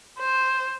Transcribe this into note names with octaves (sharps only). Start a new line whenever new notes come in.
C5